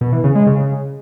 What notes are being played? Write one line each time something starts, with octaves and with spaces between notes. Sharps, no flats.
B2
E3
C#3
G#3
C#3